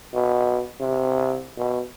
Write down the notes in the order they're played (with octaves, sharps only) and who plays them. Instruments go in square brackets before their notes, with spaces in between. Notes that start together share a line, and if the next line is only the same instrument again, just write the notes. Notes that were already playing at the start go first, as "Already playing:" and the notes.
[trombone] B2
C3
B2